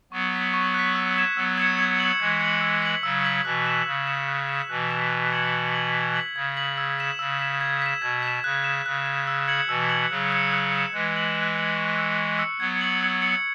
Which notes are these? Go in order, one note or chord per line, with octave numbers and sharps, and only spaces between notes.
F#3 B3 C#6
F#6 B6
C#6
F#6 B6
E6
G#6 C#7 E7
F#3 B3 E6
G#6 C#7 E7
G#6
C#7 F#7
E3 G#3 G#6
C#7 F#7
E6
B6 F#7
C#3 F#3 E6
B6 F#7
B2 E3 F#6
E7
C#3 F#6
E7
F#6
B6 E7
B2 E3 F#6
B6 E7
E6
G#6 C#7 F#7
E6
G#6 C#7 F#7
G#6
B6 F#7
C#3 G#6
B6 F#7
E6
B6 E7
C#3 E6
B6 E7
G#6
B6 E7
B2 G#6
B6 E7
C#3 F#6
E7
C#3 F#6
E7
E6
G#6 C#7 F#7
B2 E3 E6
G#6 C#7 F#7
C#3 F#3 F#6
C#7 E7
F#6
C#7 E7
E3 G#3 F#6
C#7 F#7
F#6
C#7 F#7
C#6
E6 C#7
C#6
E6 C#7
F#3 B3 G#6
C#7 F#7
G#6
C#7 F#7